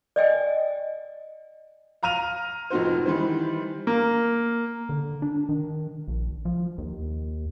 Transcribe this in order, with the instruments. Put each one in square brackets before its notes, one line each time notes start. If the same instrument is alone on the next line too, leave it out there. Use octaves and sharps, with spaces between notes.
[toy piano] D5 D#5 G5 G#5
[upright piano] F5 A#5 F6 D#7 F7
F1 F2 D#4 F#4 C5
D#3 E3 G3 C5
[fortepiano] A#3
[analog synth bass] D3
D4
D#3
A#1
F3
D#2